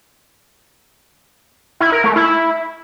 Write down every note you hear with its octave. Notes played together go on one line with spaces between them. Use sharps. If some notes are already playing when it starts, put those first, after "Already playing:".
E4
A#4
A3
E4